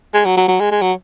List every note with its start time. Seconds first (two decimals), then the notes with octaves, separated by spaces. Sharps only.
0.14 G#3
0.25 F#3
0.37 F#3
0.48 F#3
0.60 G#3
0.71 G#3
0.82 F#3